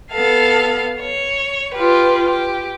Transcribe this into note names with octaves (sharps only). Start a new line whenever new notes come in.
B3 A4 F5
C#5
F4 G4 B4
G4